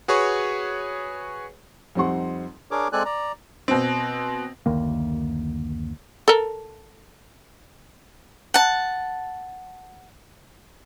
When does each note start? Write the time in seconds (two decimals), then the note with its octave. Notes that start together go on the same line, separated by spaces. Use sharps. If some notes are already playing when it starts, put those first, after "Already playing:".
0.08 F#4 G#4 B4 C#5 C#6
1.95 F2 G3 C4 D#4 F#5 C6
2.71 D4 G#4 A#4 C#5 D6
2.92 G#3 C4 A4 D5 G#5 F#6
3.05 D5 A#5
3.68 B2 C4
4.66 F#1 D2 D#3 A#3
6.28 A4 A#4
8.54 F#5 A5